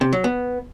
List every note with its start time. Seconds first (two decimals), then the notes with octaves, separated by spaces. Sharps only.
0.01 C3
0.13 F#3
0.24 B3